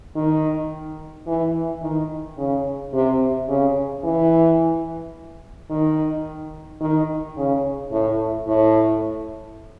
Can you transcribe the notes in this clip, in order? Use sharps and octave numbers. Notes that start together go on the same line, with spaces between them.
D#3
E3
D#3
C#3
C3
C#3
E3
D#3
D#3
C#3
A2
A2